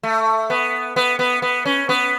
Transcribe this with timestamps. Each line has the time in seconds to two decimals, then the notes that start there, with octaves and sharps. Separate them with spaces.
0.03 A3
0.50 B3
0.96 B3
1.19 B3
1.42 B3
1.65 C#4
1.89 B3